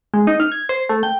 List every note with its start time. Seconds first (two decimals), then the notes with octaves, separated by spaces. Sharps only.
0.14 G#3
0.27 D#4
0.40 F6
0.52 G#6
0.69 C5
0.89 A3
1.03 G5